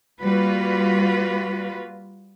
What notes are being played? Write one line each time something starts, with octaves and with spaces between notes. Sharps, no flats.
G3 A#3 F4 F#4 B4